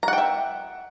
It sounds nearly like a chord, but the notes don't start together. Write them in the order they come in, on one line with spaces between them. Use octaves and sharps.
A#5 F#5 G5 E5